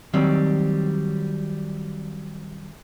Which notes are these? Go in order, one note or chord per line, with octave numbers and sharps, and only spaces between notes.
D#3 F#3 G3 C4